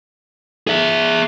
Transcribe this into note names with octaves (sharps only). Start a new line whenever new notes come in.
G#4 E5